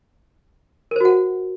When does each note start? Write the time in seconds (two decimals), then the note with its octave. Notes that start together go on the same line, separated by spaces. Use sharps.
0.91 A#4
0.96 C5
1.01 F#4
1.05 F#5